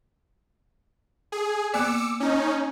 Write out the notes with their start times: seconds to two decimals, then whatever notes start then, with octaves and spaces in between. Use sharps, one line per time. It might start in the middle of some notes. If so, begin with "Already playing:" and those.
1.32 G#4
1.74 A#3 B3 D5 D6 E6 C#7
2.20 C#4 D#4